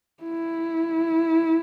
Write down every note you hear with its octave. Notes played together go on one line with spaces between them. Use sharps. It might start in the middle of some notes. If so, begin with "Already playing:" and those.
E4